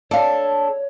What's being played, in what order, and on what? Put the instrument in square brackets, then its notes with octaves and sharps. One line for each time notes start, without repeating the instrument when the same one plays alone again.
[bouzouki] D4 A4 [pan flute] C#5 [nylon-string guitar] D5 F5